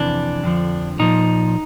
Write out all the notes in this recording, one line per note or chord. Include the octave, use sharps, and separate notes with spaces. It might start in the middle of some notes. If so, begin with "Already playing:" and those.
Already playing: F2 C3 E3 D4
F2 D3 F3
A#2 F3 D#4